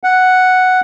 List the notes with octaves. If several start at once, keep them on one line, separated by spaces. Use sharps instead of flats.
F#5